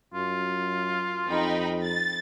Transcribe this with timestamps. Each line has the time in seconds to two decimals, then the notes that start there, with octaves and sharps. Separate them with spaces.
0.14 F#2 F4
1.29 F2 D#4 G5 B5
1.84 A6